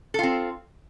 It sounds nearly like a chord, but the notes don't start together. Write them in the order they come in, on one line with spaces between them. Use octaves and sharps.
A4 F4 C4